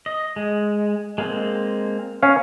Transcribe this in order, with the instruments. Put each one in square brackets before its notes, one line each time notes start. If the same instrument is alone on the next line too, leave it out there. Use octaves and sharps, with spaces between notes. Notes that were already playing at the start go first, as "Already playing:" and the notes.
[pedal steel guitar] D#5
G#3
G#3 A#3 C4
[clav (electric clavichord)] C#4 F5